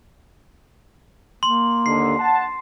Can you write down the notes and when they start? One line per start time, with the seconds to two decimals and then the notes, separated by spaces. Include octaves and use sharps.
1.43 A#3 C6
1.86 D#2 D3 C7
2.18 F#5 A5